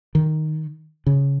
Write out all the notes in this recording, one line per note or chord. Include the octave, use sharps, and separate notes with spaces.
D#3
C#3